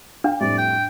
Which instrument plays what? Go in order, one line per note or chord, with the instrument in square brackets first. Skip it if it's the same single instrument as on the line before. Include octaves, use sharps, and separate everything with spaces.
[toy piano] D4 [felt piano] F5 G5
[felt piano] F2 A2 G3 [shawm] D5
[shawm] G5